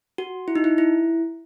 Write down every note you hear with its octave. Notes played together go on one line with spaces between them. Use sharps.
F#4
E4
D#4
E4
E4